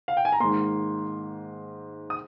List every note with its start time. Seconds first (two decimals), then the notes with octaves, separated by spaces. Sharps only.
0.08 F5
0.17 G5
0.25 G#5
0.32 A#5
0.40 G#2 D#3 A#3 C6
2.10 D#6